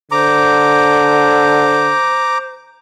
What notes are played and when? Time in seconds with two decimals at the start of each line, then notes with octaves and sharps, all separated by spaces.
0.12 D3 C5 A#5 D6